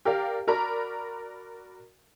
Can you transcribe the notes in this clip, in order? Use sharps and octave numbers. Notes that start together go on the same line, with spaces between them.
G4 A#4 D5 F5
F#4 A#4 D5 A#5 B5